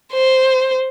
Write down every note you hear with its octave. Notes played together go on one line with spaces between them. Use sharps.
C5